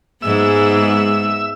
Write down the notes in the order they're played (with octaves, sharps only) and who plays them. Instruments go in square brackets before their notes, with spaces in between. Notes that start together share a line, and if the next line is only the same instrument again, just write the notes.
[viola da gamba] G#2 G#3 B3 [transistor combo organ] E5 E6